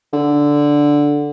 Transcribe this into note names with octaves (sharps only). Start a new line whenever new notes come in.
D3